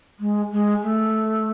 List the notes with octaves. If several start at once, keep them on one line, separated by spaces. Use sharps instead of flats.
G#3
G#3
A3